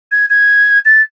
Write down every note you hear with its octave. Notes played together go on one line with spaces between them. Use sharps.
G#6
G#6
A6